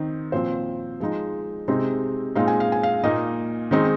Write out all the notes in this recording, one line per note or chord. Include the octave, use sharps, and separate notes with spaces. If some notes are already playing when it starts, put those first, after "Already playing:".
Already playing: D#3 C4 D#4
A#2 F3 C4 C5
F3 G#3 D#4
C3 G#3 C4 D#4
A#2 G#3 C4 D#4 F5
G#5
F5
G#5
F5
A#2 A#3 D#4 D#5
D#3 G#3 C4 D#4